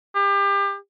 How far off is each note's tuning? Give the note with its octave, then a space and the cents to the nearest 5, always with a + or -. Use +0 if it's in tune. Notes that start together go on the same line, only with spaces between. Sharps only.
G4 +30